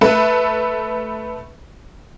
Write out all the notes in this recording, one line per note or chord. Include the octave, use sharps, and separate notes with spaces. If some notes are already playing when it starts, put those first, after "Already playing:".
A3 A4 B4 E5